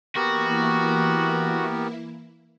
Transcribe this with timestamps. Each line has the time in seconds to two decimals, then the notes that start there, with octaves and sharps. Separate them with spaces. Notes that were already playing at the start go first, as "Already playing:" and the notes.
0.16 E3 A#3 B3 E4 F#4 G4 A#4